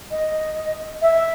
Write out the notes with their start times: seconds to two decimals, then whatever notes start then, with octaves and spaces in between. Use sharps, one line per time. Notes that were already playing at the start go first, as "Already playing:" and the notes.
0.11 D#5
1.01 E5